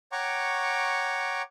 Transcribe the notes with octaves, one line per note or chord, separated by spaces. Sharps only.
C#5 F#5 G5 A#5 C#6 D6